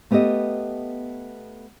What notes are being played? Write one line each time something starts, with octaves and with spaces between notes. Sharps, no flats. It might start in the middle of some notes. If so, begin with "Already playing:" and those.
A3 B3 G4 A4 D#5